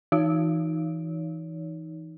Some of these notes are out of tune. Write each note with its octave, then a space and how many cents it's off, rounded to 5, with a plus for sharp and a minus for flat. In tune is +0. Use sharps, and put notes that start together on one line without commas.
E3 +0 D#4 +0 C#5 +30